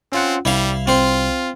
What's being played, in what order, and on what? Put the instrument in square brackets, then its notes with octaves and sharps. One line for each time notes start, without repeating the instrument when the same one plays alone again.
[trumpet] C4 [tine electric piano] C#4 F4 F#5
[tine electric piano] C2 [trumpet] G3 [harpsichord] E4 F5
[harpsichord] C4 C5 [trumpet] F4